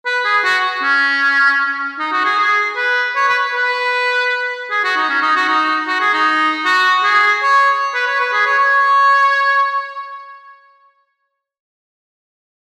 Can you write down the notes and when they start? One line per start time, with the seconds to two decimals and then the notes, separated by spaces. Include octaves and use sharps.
0.06 B4
0.25 G#4
0.44 F#4
0.83 C#4
1.99 D#4
2.12 F#4
2.25 G#4
2.39 G#4
2.77 B4
3.16 C#5
3.29 B4
3.55 B4
4.71 G#4
4.84 F#4
4.97 D#4
5.10 C#4
5.22 D#4
5.36 F#4
5.48 D#4
5.87 F#4
6.00 G#4
6.13 D#4
6.65 F#4
7.04 G#4
7.43 C#5
7.94 B4
8.07 C#5
8.20 B4
8.33 G#4
8.46 C#5
8.59 C#5